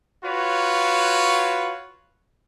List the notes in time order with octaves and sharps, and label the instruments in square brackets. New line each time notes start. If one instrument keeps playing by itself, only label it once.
[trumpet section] F4 F#4 B4 C#5